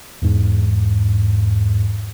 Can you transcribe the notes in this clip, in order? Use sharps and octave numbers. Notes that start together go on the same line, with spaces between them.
E2 G#2